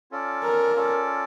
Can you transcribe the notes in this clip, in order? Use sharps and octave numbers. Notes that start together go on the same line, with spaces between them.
C#4 F4 A4 D5
A#4
C#4 F4 A4 D5